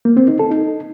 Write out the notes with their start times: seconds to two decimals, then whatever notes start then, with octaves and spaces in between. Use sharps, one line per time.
0.05 A#3
0.17 C4
0.28 D#4
0.39 A4
0.51 D#4